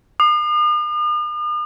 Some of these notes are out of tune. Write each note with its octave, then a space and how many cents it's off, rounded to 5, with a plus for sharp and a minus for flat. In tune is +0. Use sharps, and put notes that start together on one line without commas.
D#6 -45